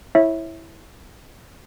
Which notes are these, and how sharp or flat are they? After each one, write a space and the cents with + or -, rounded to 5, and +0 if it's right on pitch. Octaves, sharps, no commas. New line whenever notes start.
E4 -5 C#5 -20 E5 -10